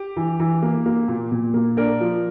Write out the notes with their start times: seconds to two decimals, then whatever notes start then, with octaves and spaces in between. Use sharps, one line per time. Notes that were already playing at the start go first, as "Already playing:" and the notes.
Already playing: G4
0.17 E3
0.40 E3
0.63 A#3
0.86 A#3
1.08 A#2
1.32 A#2
1.54 A#3
1.77 D4 A#4
2.01 F3